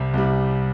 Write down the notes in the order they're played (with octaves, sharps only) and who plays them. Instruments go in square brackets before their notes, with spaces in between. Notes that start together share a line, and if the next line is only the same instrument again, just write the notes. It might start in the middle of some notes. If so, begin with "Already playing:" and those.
Already playing: [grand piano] C2 C3 G3
C2 C3 G3